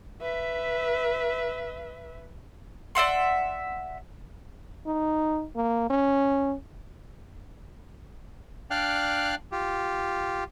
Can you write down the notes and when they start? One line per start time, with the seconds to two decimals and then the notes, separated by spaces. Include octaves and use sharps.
0.21 B4 E5
2.95 D5 E5 F#5 C6
4.86 D#4
5.55 A#3
5.90 C#4
8.71 D4 D5 F5 G5 F6 F#6
9.52 F4 G4